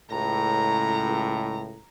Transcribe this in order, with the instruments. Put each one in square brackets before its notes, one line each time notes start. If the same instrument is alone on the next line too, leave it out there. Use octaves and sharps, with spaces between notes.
[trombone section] C#2 A2 [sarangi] A#5